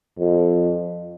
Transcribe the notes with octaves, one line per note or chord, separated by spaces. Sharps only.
F2